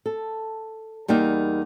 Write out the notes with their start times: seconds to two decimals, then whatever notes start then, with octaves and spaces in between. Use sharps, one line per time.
0.06 A4
1.08 E2 G3 A#3 D#4 D5 E5